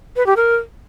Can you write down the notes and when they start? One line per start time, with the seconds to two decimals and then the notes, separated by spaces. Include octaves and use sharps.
0.16 B4
0.26 G4
0.36 A#4